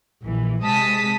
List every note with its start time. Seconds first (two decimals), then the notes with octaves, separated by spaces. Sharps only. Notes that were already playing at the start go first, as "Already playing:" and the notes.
0.23 A#1 E3
0.63 C3 G#3 A5 D#6 B6